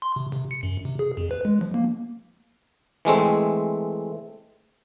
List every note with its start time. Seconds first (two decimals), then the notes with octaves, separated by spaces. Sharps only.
0.02 C6
0.16 C3
0.32 C3
0.51 C#7
0.63 F#2
0.85 C3
0.99 G#4
1.17 F2
1.31 B4
1.45 G#3
1.61 F3
1.74 A#3
3.05 E3 G#3 A3 C4